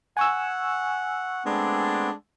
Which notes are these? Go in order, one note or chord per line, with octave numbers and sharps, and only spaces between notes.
F#5 G#5 C#6 E6
G#3 A3 B3 C4 D4